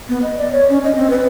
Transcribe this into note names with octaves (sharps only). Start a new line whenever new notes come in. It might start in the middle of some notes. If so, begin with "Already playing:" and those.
B3
D#5
D5
C#5
C#4
D#5
C4
B4